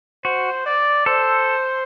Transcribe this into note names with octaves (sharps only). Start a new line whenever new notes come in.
F#4 C5
D5
A4 C5